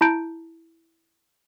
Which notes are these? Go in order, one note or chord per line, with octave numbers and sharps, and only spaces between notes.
E4 A5 A#5 G6 D7